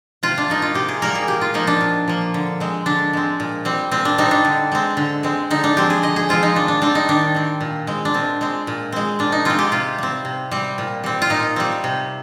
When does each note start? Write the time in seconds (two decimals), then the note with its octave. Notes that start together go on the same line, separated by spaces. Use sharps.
0.23 C3 F4
0.38 D4
0.48 G3 A#3 D#4
0.62 F4
0.74 C3 G4
0.89 G#4
1.02 G3 A#3 A#4
1.15 G#4
1.27 A#2 G4
1.41 F4
1.54 F3 A#3 D#4
1.67 D4
1.81 A#2
2.08 F3 A#3
2.34 D3
2.60 G#3 C4
2.86 D3 D4
3.13 G#3 C4
3.40 A#2
3.65 G3 C4
3.91 A#2 C4
4.05 D4
4.18 G3 C4 D#4
4.31 D4
4.45 D3
4.72 G#3 C4
4.97 D3
5.23 G#3 C4
5.50 D3 D#4
5.64 D4
5.77 F3 G#3 C4 G4
5.90 G#4
6.03 D3 D#5
6.16 G#4
6.29 F3 G#3 C4 F4
6.43 D#4
6.55 D#3 D4
6.68 D4
6.82 G3 C4 D4
6.95 D#4
7.09 D#3 D4
7.35 G3 C4
7.61 A#2
7.87 G#3 C4
8.05 D4
8.14 A#2 C4
8.41 G#3 C4
8.67 A#2
8.92 G#3 C4
9.19 A#2 D4
9.32 D#4
9.45 G#3 C4 F4
9.59 G4
9.72 C3 F4
9.98 G3 C4
10.25 C3
10.51 G3 C4
10.78 A#2
11.04 G3 C4
11.22 F4
11.30 A#2 D#4
11.56 G3 C4
11.84 C3